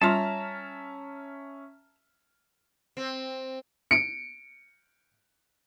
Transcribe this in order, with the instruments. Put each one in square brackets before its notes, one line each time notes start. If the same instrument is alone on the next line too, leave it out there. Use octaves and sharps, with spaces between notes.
[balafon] G3 F4 C6 [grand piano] C#4 E5 F6 [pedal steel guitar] A5 A#5
[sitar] C4
[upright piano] C#7 D7